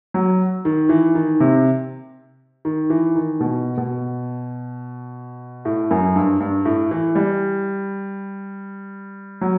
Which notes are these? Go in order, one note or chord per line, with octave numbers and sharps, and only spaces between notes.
F#3
D#3
E3
D#3
C3
D#3
E3
D#3
B2
B2
A2
F#2
G2
G2
A2
E3
G3
F#3